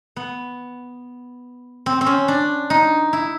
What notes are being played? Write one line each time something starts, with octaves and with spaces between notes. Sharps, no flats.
B3
C4
C4
C#4
D4
D#4
E4